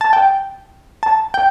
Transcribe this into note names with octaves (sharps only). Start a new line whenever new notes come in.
A5
G5
A5
G5